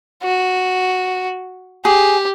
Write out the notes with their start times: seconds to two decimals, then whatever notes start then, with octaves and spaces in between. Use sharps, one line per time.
0.23 F#4
1.85 G4 G#4